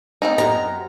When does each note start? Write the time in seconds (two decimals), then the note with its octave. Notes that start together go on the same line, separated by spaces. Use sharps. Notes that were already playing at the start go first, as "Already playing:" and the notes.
0.22 B3 C4 D#4
0.38 F#2 A#5